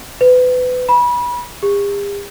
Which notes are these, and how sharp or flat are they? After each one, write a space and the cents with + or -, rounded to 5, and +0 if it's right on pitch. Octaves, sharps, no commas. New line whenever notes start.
B4 +30
B5 -30
G4 +45